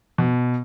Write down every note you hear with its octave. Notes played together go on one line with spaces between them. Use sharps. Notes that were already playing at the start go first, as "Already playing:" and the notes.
B2